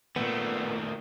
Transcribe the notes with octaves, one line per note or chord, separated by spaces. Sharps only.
A#2 D#3 A3 B3